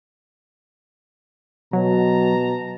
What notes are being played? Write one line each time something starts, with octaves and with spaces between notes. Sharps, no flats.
B2 F#3 A5 A#5